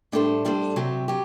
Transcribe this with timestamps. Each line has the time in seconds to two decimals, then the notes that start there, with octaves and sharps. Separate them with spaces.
0.12 A2 G3 D4 A4 C5
0.45 A2 G3 D4 A4 C5
0.76 C3 F#3 C4 G4
1.08 F#3 G4